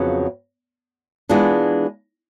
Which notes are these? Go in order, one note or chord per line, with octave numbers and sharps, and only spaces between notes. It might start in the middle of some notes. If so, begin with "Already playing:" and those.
Already playing: F2 C#3 F#3 B3
E3 G#3 B3 D4 F4